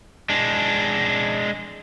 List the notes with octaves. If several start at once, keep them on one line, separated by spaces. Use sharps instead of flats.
G#3 D4